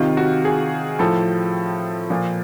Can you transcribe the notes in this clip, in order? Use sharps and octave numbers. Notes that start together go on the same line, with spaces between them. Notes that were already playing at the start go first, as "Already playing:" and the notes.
Already playing: C3 D#3 F4
F#4
G#4
A2 F3 A4
A#2 F3